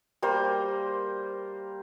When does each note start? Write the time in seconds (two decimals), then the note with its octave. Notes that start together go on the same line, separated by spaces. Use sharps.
0.22 G3 A#3 C5